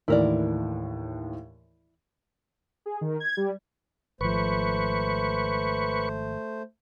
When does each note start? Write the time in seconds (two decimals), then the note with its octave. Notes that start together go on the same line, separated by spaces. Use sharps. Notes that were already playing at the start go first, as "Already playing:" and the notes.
0.08 D#2 A2 E3 E4 A#4 D5
2.86 G#4
3.01 D#3
3.20 G#6
3.37 G3
4.21 G#1 F3 A3 B4 C5 C#6